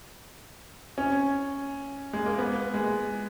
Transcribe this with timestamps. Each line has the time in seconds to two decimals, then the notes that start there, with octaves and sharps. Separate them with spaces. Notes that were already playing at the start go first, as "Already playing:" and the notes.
0.98 C#4
2.13 G#3
2.26 A#3
2.38 B3
2.74 G#3